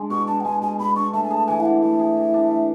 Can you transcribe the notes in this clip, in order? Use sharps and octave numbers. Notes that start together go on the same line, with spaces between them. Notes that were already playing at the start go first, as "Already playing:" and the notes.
Already playing: G#3 D4
B2 C#6
D4 A5
F#5
G#3 G#5
B2 G#5
B2 B5
D4 C#6
A3 A5
G#5
G#4 A5
E3 G#5
E5
D4 F#5
A3 E5
G#4
E3
D4
A3